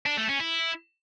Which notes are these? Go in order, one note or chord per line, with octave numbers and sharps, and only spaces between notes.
D4
A3
C#4
E4